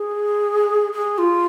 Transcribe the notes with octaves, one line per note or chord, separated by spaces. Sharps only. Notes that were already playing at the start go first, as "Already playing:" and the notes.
Already playing: G#4
G#4
F4